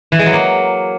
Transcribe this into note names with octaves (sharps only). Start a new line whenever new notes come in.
E3
G#3
F#3
A#3